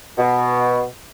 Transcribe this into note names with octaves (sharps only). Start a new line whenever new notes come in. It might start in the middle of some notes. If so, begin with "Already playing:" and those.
B2